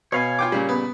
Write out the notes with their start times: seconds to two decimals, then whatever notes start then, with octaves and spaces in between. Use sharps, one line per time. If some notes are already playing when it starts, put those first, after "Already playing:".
0.12 B2 C#5 F5 G#5
0.39 F4 G5 D6
0.52 A#2 C#3 G3
0.69 B3